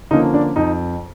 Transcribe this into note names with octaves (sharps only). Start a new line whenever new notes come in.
D3 F3 A#3 C#4 D#4
D4
F2 D#4